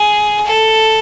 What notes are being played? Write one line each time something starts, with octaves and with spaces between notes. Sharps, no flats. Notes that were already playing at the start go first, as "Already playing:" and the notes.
Already playing: G#4
A4